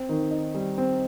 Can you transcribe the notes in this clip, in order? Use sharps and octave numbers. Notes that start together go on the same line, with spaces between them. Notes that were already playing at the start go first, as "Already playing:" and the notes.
Already playing: C4
D#3
D#4
G3
C4